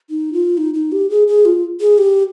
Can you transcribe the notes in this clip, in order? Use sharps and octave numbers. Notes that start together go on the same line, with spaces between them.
D#4
F4
D#4
D#4
G4
G#4
G#4
F4
G#4
G4